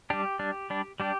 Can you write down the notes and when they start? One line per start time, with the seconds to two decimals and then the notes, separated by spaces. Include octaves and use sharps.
0.10 G3 D4 G4
0.39 G3 D4
0.70 G3 D4
1.00 G3 D4 G4